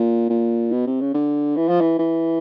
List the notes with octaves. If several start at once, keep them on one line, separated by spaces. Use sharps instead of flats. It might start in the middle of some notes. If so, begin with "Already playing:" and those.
Already playing: A#2
A#2
B2
C3
C#3
D3
E3
F3
E3
E3